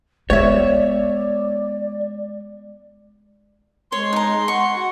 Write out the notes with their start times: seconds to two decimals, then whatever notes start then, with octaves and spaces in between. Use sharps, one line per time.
0.30 G#3 B3 C#5 D5 E5
3.92 G#3 C#5 C6
4.13 D#4 A#5
4.48 F#5 C#6
4.76 F#4